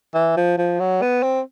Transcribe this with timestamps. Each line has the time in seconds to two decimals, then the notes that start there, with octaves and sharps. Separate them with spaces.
0.14 E3
0.37 F3
0.58 F3
0.80 F#3
1.02 B3
1.23 C4